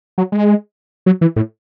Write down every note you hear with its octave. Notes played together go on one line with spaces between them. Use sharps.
F#3
G#3
F#3
E3
A2